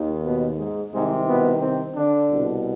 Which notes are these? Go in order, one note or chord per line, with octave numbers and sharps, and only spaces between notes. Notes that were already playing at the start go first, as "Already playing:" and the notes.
Already playing: D#2 D#3
B2 B3
G#2 G#3
C2 G#2 C3 D#3 G#3
B2 B3
C3 C4
D3 D4
C2 B2